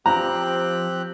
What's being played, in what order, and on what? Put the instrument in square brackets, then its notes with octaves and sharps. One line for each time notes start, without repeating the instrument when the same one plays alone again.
[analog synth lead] F3 [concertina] C4 G4 F#6 [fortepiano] A#5